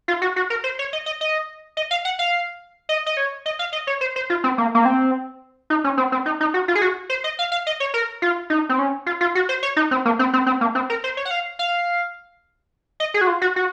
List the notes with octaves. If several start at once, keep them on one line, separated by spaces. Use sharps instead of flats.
F4
F#4
F#4
A#4
C5
C#5
D#5
D#5
D#5
D#5
F5
F#5
F5
D#5
D#5
C#5
D#5
F5
D#5
C#5
C5
C5
F4
C4
A#3
A#3
C4
D#4
C#4
C4
C4
D#4
D#4
F#4
F4
G#4
F#4
C5
D#5
F5
F5
D#5
C#5
A#4
F4
D#4
C4
C#4
F4
F4
F#4
C5
C#5
D#4
C4
A#3
C4
C4
C4
A#3
C4
A#4
C5
C#5
F#5
F5
F5
D#5
G#4
F#4
F4
F#4
F#4